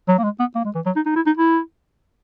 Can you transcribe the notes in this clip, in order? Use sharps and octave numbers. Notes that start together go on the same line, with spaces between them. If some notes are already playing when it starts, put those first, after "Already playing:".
F#3
A#3
G#3
B3
A#3
G#3
E3
F#3
D#4
D#4
E4
D#4
E4